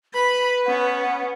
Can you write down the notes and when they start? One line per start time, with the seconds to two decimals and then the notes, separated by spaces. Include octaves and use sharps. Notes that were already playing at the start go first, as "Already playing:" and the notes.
0.14 B4 B5
0.66 B3 C#4 F#5